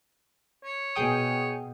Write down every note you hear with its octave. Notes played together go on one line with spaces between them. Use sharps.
C#5
B2 G#4 G5 D#6